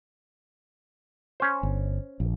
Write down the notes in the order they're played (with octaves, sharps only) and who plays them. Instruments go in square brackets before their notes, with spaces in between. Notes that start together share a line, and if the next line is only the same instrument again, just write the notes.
[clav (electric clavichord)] C#4 C5
[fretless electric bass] G1
A#1